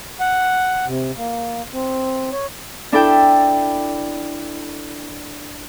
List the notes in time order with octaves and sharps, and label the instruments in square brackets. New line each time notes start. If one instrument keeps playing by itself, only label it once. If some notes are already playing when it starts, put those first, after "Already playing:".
[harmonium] F#5
C3
A#3
C4
C#5
[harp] D4 E4 A4 G5